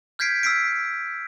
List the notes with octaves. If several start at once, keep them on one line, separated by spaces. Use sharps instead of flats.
F6 G6 G#6 B6 C7 D7
E6 F6 B6 C7 D7